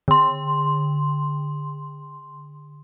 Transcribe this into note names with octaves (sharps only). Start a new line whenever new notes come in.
D3 C6